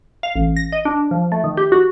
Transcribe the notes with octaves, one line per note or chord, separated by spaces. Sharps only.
F5
A1
A#6
D#5
D4
F3
A3
D#3
G4
F#4